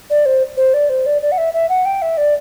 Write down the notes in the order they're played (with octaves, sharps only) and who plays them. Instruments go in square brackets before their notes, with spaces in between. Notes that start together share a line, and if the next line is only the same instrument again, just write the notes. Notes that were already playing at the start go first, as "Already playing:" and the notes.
[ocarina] D5
C5
C5
D5
C5
D5
D5
F#5
E5
E5
F#5
G5
E5
D5